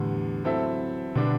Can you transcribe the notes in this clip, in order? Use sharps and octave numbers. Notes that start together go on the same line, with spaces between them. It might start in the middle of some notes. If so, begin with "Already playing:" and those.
Already playing: E2 A2 D3 G3
F#3 C4 E4 A4 E5
B2 D3 G3 B3 D4 G4